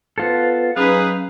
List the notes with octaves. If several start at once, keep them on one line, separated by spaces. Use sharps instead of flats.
B3 F4 A4 B4 C5
F#3 C#4 D#4 G#4 B4 F5